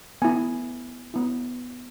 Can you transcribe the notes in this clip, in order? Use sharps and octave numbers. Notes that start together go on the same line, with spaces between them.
B3 E4 G#5
B3 E4